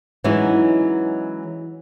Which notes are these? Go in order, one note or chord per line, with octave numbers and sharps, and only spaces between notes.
E3 F#3 G#3 C#4 D#4 E4